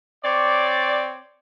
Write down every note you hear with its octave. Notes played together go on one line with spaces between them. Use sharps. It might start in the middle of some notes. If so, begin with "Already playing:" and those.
C4 C#5 D5